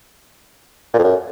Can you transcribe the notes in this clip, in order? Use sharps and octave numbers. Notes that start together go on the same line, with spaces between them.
A#2
F2
F#2